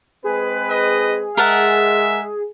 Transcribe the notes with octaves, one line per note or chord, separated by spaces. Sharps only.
G#3 C4 G#4 B4
D#5
G#3 A#4 E5 F#5 A5